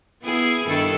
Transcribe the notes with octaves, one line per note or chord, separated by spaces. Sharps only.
B3 E4 G#4
G2 D#3 A4